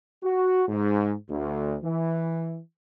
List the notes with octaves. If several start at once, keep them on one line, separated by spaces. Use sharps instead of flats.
F#4
G#2
D2
E3